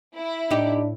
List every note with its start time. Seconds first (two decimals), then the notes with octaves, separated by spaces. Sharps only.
0.16 E4
0.50 A2 D4 D#4 G4